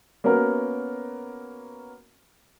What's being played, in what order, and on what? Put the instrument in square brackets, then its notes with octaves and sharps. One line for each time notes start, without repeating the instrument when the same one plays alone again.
[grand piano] A#3 B3 C#4 F#4 A#4